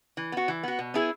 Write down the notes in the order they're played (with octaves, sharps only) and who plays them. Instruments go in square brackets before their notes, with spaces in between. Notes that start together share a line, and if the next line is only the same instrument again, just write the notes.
[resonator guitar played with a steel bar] E3
B3 F#4
E3
B3 F#4
B2
B3 E4 G#4